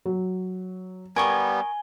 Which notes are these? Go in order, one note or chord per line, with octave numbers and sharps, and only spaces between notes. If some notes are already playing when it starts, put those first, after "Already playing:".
F#3
G3 B3 A#4 G#5 C#6 D#6 G#6 G7